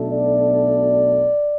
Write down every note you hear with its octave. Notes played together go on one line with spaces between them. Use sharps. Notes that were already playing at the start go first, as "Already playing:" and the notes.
Already playing: B1 B2 A3 D4
D5